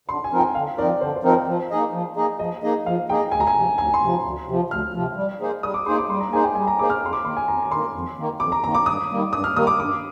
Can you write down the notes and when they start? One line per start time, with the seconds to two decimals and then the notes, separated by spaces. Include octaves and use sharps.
0.08 D3 C6
0.24 G#5
0.32 F3 C4 D#4 A#4
0.39 G5
0.55 D3 F5
0.77 F3 C4 D#4 A#4 D5
1.00 D3 C5
1.16 C5
1.23 F3 C4 D#4 A#4
1.32 C5
1.48 F3
1.70 A#3 D#4 G#4 D#5
1.93 F3
2.16 A#3 D#4 G#4 D#5
2.39 F3 D#5
2.63 A#3 D#4 G#4 D#5
2.86 F3 F5
3.09 A#3 D#4 G#4 D#5 G5
3.32 D2 G#5
3.40 A#5
3.47 G#5
3.55 C3 F3
3.78 D2 G#5
3.94 C6
4.01 C3 F3
4.24 D2
4.47 C3 F3
4.70 D2 F6
4.94 C3 F3
5.16 G3
5.40 A#3 D#4 G#4 C5
5.63 G3 D#6
5.74 D6
5.86 A#3 D#4 G#4 C5 C6
5.98 D6
6.09 G3 C6
6.21 A#5
6.32 A#3 D#4 G#4 C5 G#5
6.44 G5
6.55 G3 G#5
6.67 A#5
6.79 A#3 D#4 G#4 C5 D6
6.90 F6
7.02 F2 C6
7.13 D6
7.25 D#3 A#3 C6
7.37 G#5
7.48 F2 A#5
7.63 A#5
7.70 D#3 A#3 C6
7.94 F2
8.18 D#3 A#3
8.40 F2 D6
8.52 A#5
8.64 D#3 A#3 A#5
8.74 D6
8.86 G2 D#6
9.10 D#3 G3 A#3
9.33 G2 D#6
9.44 F6
9.56 D#3 G3 A#3 D#6
9.67 D6
9.80 G2 D6